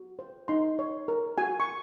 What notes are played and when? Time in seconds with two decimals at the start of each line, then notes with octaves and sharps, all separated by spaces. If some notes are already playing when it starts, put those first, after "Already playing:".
Already playing: F#4
0.19 C5
0.48 D#4 C6
0.79 C#5
1.08 A#4
1.38 F#4 G#5
1.60 C#6